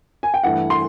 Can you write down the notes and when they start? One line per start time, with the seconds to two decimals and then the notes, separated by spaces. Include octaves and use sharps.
0.23 G#5
0.34 G5
0.43 G2 E3 A3 F#5
0.70 C6